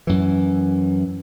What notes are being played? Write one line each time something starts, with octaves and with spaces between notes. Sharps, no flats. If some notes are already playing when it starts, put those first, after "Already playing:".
F#2 E3